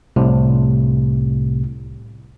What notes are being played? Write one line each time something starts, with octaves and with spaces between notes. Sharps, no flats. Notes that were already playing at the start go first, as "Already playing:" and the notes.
C2 A2 C3